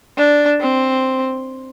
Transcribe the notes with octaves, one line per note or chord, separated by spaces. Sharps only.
D4
C4